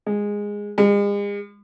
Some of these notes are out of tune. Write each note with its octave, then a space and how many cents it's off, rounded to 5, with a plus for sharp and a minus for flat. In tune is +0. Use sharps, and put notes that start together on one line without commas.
G#3 -10
G#3 -40